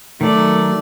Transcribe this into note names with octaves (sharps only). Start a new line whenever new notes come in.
D#3 F#3 A3 D5